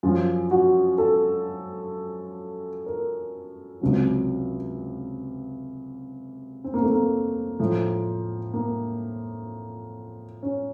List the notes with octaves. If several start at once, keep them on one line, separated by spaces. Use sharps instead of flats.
F#2 F3 F4
F#4
A4
A#4
C#2 C3 F#3
C4
A#3
A3
A#3
A2 F3
A#3
C#4